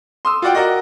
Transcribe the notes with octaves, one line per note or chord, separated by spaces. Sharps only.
C6 D#6 E6
F4 F#4 D5 F#5 G5
F#4 A#4 D5 D#5